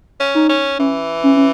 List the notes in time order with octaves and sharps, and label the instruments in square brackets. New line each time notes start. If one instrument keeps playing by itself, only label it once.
[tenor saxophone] C#4
[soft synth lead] D#4
[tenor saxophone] C#4
[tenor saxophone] E3 [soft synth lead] C#4
[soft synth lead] C#4
C#4